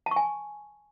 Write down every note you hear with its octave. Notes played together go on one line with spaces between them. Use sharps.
A5
C#6
G#5